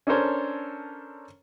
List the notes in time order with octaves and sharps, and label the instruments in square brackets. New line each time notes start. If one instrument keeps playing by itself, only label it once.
[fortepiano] C#4 D4 A4 A#4 C5 C#5